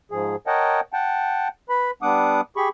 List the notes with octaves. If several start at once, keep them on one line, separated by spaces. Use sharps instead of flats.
G#2 F3 G#4
A#4 C#5 D#5 F#5 G5 A5
F#5 G5 A5
B4 B5
G3 B3 D4 F#5 D6 D#6
G4 G#4 B5 C#6